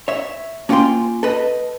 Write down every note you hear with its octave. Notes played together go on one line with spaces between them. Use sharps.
C#5 E5
A#3 C#4 F4 F#5 G5 C6
A4 B4 D#5